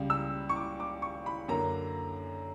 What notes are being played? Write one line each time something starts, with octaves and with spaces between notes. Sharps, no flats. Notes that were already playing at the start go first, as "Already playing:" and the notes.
Already playing: C#2 C#3 G3
E6
C#6
D6
D6
C#6
B5
F#2 D3 A#3 A#5